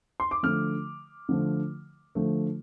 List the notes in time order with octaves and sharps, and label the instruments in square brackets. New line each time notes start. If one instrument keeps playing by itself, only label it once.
[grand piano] C6
D6
D3 F3 A3 F6
D3 F3 A3
D3 F3 A3